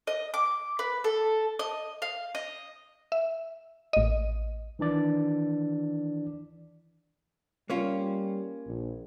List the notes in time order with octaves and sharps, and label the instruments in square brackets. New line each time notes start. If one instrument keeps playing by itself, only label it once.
[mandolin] D#5
D6
B4
A4
D#5
F5
D#5
[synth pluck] E5
A1 D#5
[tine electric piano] D#3 E3 D4 D5
[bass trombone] G3 [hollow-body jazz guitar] A#3 C#4 F4
[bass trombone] A#1